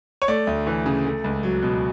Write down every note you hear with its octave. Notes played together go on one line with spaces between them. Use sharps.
C#5
A3 D5
D2
E3
C#3
A3
C#2
F#3
B2